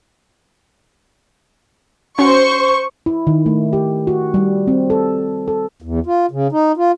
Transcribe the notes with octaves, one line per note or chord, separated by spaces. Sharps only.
C#4 F#4 C5 C#6
E4
D#3
A3
G4
F#4
G3
C4
A4
A4
E2
F4
C#3
D#4
F4